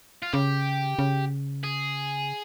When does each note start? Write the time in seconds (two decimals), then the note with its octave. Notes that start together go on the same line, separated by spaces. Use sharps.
0.23 F4
0.33 C#3 G4
0.99 C#3
1.64 G#4